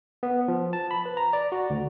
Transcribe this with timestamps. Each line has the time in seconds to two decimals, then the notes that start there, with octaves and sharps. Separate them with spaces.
0.23 B3
0.48 F3
0.73 A5
0.91 B5
1.06 B4
1.17 A#5
1.33 D5
1.52 F#4
1.70 D2